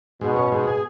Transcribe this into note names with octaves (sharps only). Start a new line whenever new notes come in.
G#2 B2
C#4
G#2
G#4